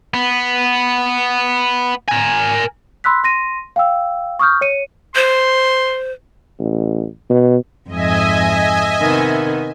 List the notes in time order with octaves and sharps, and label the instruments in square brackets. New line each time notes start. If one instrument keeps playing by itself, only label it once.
[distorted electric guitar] B3
A#4 G#5
[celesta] B5 C6 E6 F#6 B6
C6 A#6 D#7
F5 G5 E6
C#6 D#6 F6 G6
C#5 C#7 D#7
[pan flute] C5 [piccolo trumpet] C6
[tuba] A1
B2
[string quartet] F2 G#2 [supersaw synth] D#5 E5 G#5
[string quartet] C3 D#3 B3